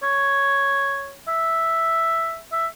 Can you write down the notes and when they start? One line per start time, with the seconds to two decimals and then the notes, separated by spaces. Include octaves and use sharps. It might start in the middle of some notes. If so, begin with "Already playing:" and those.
0.03 C#5
1.28 E5
2.52 E5